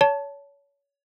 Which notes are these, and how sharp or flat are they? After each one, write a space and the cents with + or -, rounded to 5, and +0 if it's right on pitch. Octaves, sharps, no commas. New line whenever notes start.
C#5 +30 A5 +0